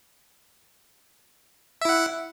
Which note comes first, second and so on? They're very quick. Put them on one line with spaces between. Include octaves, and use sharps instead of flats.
E5 E4 F#5